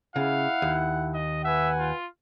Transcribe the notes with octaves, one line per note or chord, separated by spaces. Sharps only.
C#3 E4 F5 F#5
D#2
D#5
B4 E5 F#5 G#5
F4